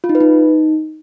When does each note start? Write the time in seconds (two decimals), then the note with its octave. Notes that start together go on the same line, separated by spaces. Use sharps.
0.04 F4
0.09 D#4
0.15 B4
0.20 D#4